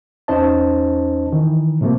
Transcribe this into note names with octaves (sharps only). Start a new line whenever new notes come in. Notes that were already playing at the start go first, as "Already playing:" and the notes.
E2 C#4 D#4 C5 D#5 A5
D#3 E3
A2 C3 F3 A3 A#3